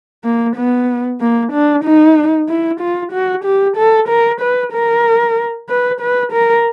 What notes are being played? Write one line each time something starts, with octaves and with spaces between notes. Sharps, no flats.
A#3
B3
A#3
D4
D#4
E4
F4
F#4
G4
A4
A#4
B4
A#4
B4
B4
A#4